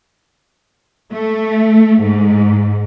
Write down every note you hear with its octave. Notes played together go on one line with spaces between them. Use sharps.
A3
G#2